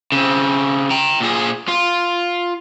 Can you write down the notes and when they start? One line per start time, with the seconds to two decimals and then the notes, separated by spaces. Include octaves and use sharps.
0.12 C#3 C4
0.91 G5 A#5
1.20 A#2 G#4
1.68 F4